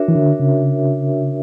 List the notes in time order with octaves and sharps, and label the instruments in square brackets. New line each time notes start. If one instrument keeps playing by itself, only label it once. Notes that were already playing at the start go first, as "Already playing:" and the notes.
Already playing: [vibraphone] D4 F#4 A#4 C#5 E5
[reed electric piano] E3
D3
C#3